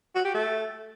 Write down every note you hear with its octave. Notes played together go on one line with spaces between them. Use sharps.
F#4
G4
A3